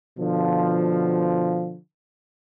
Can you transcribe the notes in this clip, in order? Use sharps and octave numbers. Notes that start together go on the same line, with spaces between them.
B2 D3 F3